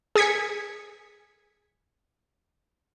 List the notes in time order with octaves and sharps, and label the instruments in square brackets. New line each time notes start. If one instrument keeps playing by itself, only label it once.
[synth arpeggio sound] G#4 D#6 G#6 B6 C#7